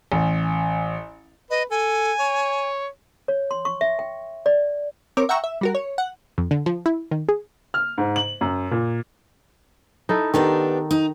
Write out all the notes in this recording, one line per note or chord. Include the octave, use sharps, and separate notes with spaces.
A1
B4 D#5
A4 G#5
C#5
C#5
C6
C#6
E5
G5
D5
C4 A#4 C#5 D6
E5 F#5 G5 A#5 C#6 E6
E5
G3 F#4 A#4
C#5
F#5
F2
D3
F3
E4
D#3
G#4
F6
G#2
F#7
F#2
A#2
D#4 E4 A4
D#3 B3 D4 G4 A4
D#4